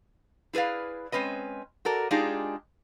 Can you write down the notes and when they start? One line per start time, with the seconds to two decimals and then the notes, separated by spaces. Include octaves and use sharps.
0.53 E4 G#4 B4 D5 F5
1.12 G#3 C4 C#4 B4 D#5
1.85 F#4 A4 A#4 D5
2.11 G#3 D4 D#4 F4 G4 G#4